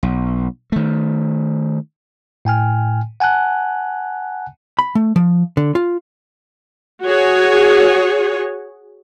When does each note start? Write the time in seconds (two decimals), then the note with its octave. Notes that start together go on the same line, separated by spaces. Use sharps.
0.03 B1
0.72 D#3 A3
2.45 A2 G5 G#5 F6
3.20 F#5 G#5 A5 F#6
4.79 B5
4.95 A3
5.16 F3
5.57 D3
5.75 F4
7.04 F#4 G#4 C#5